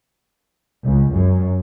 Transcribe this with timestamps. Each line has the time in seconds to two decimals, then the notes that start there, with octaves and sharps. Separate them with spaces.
0.83 C#2
1.13 F#2